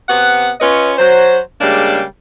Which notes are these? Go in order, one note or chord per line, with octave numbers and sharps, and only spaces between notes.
C3 B3 F#5
C#4 F4 B4 C#5 D#5
F#3 C5
C#3 G3 G#3 A#3 D4